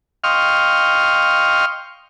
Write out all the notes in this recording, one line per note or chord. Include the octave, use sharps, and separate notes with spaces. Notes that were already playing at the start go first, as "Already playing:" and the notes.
D#5 F5 G5 C6 C#6 F6